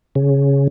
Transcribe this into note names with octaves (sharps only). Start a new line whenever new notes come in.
C#3